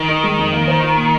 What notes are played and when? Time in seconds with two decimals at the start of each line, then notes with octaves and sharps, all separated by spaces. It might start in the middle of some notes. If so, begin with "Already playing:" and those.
Already playing: D#3
0.08 D#4
0.24 G#3
0.39 F2
0.53 A#3
0.68 C5
0.83 F4
0.96 A#2